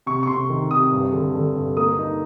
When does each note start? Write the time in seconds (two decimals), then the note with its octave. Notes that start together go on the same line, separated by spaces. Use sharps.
0.06 C3 C#6
0.23 C#6
0.27 C3 C6
0.49 D#3
0.70 C3 D#6
0.92 G2
1.13 D3
1.35 D3
1.56 G2
1.77 A#3 D#6
1.98 D#4